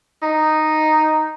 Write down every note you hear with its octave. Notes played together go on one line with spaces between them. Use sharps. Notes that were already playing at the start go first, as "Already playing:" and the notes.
D#4